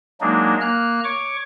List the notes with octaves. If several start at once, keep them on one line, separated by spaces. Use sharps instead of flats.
F#3 G#3 A#3 D4 D#4
A#3 F6 F#6
C#5 C#6 D6